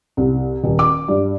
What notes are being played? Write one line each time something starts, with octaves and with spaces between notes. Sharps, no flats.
C2
D#1
D6
G2